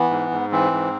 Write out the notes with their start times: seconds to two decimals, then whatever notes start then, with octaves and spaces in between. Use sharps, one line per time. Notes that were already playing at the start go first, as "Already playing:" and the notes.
Already playing: E3 B3
0.10 G#2
0.31 G#2
0.52 E3 C4
0.72 G#2